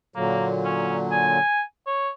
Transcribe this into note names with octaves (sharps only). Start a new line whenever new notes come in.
A#2 D3 F#3 A#3
C#4
G#5
C#5